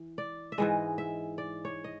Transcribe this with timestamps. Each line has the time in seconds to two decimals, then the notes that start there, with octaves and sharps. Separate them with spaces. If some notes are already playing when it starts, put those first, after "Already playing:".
Already playing: E3
0.18 D5
0.52 E5
0.58 G#2 E3 G#3 D#5
0.98 E5
1.38 D5
1.65 C#5
1.84 D#5